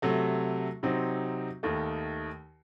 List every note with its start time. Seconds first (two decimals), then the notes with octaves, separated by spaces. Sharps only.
0.02 C3 F#3 A3
0.83 C3 F#3 C4 D#4
1.63 D#2 D#3 A3 D#4